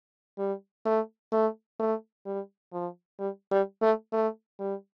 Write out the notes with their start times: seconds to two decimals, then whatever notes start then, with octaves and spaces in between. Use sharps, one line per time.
0.39 G3
0.85 A3
1.32 A3
1.79 A3
2.26 G3
2.73 F3
3.19 G3
3.51 G3
3.82 A3
4.13 A3
4.60 G3